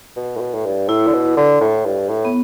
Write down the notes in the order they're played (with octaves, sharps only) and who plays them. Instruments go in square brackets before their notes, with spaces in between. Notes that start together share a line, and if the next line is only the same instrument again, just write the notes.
[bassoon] B2
A2
B2
A2
G2
[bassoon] A2 [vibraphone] E4
[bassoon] D3
B2
D3
A2
G2
A2
[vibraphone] B3